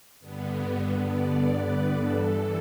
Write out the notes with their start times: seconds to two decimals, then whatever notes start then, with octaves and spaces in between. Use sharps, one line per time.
0.20 G2 D3 B3
1.08 D5
1.50 B4
1.94 G2 E3 A4